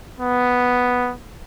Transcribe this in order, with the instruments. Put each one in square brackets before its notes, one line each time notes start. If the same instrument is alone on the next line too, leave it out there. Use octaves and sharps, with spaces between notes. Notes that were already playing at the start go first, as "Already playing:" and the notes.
[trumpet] B3